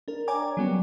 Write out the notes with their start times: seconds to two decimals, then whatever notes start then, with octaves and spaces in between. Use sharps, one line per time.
0.08 D4 A#4
0.28 C#5 D5 G5 G#5 A#5 D6
0.57 F#3 G3 B3 C#4 F#4